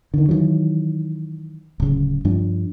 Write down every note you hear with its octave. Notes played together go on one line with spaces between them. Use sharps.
D3 D#3
D#3 E3 F#3
D1 C#3
G2 F3 D4